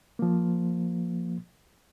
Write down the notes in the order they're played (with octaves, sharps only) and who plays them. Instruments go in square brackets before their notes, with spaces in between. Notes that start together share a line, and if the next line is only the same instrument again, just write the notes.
[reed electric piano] F3 A#3